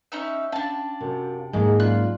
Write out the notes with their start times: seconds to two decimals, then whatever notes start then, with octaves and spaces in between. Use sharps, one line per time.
0.12 C#4 D#4 E5
0.52 C#4 D4 F5 G5 A5
1.01 F#2 C3
1.53 B1 G#2 D#3 G#3 A#3 G#4
1.80 F#3 C#4 F4 D5 F#6